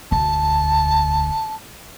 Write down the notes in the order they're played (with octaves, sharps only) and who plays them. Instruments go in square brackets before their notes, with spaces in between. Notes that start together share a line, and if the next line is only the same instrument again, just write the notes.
[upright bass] E1 D2 [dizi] A5